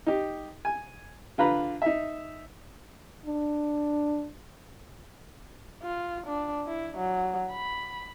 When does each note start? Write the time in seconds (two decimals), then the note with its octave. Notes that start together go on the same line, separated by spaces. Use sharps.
0.06 D#4 G4
0.65 G#5
1.38 D3 F4 B4 A#5 B5
1.82 D#4 E5
3.26 D4
5.82 F4
6.27 D4
6.67 E4
6.97 F#3
7.52 B5